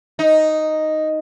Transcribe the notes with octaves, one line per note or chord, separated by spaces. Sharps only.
D#4